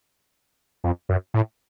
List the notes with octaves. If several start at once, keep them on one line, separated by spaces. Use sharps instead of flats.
F2
F#2
A2